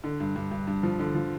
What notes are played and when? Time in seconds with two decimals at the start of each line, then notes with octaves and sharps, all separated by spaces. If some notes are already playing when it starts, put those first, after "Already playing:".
0.04 D3
0.20 G2
0.36 G2
0.51 G2
0.67 G2
0.83 F3
0.99 D3
1.15 F3